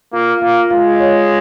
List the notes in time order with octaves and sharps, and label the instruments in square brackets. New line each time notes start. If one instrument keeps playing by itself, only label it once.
[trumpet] A#3 [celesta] F4 F5
[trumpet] A#3 [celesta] F4 F5
[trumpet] G#3 [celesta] F4 F5
[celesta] D#5
C#5